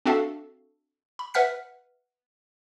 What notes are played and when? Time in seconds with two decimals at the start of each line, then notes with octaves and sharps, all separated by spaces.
0.06 C4 D4 F#4 A4 E5 F5
1.19 B5
1.34 B4 E5 F#5 F6 B6